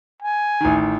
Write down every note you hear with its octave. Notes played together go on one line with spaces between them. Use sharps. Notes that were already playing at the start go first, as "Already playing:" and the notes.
G#5
A1 D#3